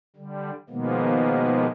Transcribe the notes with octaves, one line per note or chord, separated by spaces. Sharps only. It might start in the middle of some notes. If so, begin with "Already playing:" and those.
D3 G3
B2 D#3 F3 G#3 A#3 B3